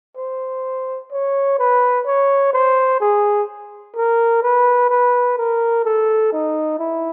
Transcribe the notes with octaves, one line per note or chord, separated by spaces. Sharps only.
C5
C#5
B4
C#5
C5
G#4
A#4
B4
B4
A#4
A4
D#4
E4